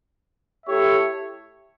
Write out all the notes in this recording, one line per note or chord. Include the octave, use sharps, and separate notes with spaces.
A3 E4 G4 C#5 E5